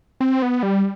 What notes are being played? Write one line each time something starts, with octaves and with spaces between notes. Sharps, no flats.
C4
B3
G3